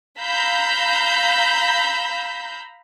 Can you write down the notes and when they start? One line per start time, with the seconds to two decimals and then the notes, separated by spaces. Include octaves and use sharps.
0.20 F5 A#5 B5 E6 G6